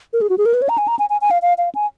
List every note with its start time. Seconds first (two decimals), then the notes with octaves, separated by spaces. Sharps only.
0.13 A#4
0.21 G#4
0.30 F#4
0.38 G#4
0.46 A#4
0.54 B4
0.62 C#5
0.69 A#5
0.78 G#5
0.88 A#5
0.99 G#5
1.10 G#5
1.21 G#5
1.31 F5
1.42 F5
1.58 F5
1.75 G#5